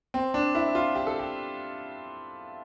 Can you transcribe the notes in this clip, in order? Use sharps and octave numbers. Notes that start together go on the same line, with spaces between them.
C4
D4
E4
F4
G4
A4
G4